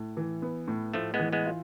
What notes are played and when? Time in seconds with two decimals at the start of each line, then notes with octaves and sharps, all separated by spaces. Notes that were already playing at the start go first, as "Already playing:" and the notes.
Already playing: A2
0.17 E3
0.42 B3
0.68 A2
0.94 A2 F3 A3
1.14 G#3 B3
1.19 E3
1.33 G#3 B3
1.46 F4